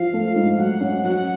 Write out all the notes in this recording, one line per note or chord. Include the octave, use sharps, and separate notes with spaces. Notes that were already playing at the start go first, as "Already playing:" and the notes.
Already playing: F3 F5
A3
G#2
F#3 F#5
C#4
F#3 F#5